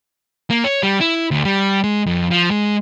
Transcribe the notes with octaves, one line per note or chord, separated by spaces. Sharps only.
A#3
C#5
G3
E4
D2
G3
G#3
F2
F3
G#3